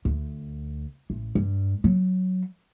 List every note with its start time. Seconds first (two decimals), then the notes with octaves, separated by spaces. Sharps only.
0.05 D2
1.10 A1
1.35 G2
1.84 F#3